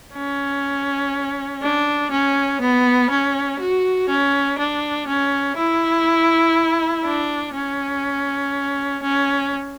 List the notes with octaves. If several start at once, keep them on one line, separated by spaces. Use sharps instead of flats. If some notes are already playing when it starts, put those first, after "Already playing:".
C#4
D4
C#4
B3
C#4
F#4
C#4
D4
C#4
E4
D4
C#4
C#4